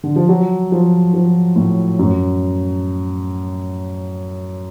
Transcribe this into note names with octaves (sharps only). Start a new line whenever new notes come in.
D3
F3
F#3
F3
F3
A2
F#2